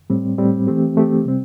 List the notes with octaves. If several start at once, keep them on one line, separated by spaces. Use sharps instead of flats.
A2 G3 C4
A2 G3 C4
E3 A3 C4 G4
E3 A3 C4 G4
C3 G3 C4